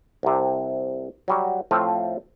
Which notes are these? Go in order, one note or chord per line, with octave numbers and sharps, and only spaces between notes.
C2 C3
F#3 G3 F#4
A2 F3 A3 C4 F4